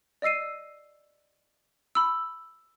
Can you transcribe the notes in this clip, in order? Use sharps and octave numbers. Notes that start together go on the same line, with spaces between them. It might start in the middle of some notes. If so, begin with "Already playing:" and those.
D5 D#5 E6 C7 D#7
B5 E6